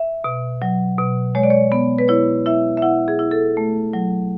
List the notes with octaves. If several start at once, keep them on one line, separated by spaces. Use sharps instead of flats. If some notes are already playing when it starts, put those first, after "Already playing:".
Already playing: E5
B2
F#3
B2
G#3 C#5
D5
C#5
B3
B4
E4 C#5
E4 E5
E5
E4 F#5
G#4
E4
A4
A3
F#3